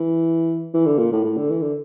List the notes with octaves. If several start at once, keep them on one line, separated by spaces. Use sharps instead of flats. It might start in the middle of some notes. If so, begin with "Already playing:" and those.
Already playing: E3
E3
D3
A#2
A2
A2
D3
E3
D3